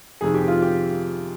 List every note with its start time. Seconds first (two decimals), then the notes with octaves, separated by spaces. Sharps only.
0.21 F2 C3 D#3 G#4
0.34 G4
0.48 F4
0.62 G4